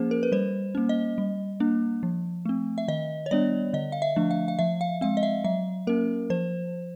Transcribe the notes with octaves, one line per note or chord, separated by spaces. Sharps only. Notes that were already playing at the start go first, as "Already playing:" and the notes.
Already playing: F3 A#3 C#4 G#4 C5
A#4
B4
G3 C5
A#3 C#4
D#5
G3
A#3 D4
F3
A3 C4
E5
D#3 D#5
C#5
G3 B3 D4 D5
D3 D#5
F5
E5
F3 A3 D4
F5
F5
F3 E5
F5
G#3 C4 F5
D#5
E5
F#3 E5
A#3 C#4 A#4
F3 C5